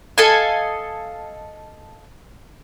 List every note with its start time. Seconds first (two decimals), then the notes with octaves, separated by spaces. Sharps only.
0.18 A4 D#5 F5 G#5